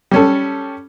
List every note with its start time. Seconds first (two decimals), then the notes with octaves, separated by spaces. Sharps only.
0.11 G3 C#4 A4